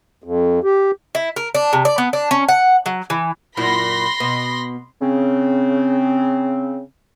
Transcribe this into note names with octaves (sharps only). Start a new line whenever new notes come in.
F2
G4
E4
A#4
D4
C3
D5
B3
D4
C#4
F#5
F#3
E3
F#2 A#2 E4 B5 C6 A#6
B2
C#3 C4